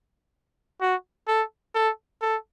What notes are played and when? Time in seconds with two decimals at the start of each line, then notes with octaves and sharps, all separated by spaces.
0.81 F#4
1.28 A4
1.75 A4
2.22 A4